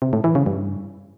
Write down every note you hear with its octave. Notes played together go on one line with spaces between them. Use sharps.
C3
A2
E3
C#3
G2